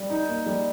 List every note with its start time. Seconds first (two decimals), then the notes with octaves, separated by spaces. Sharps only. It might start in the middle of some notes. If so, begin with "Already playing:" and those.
Already playing: G3
0.10 D#4
0.29 A#3
0.46 G3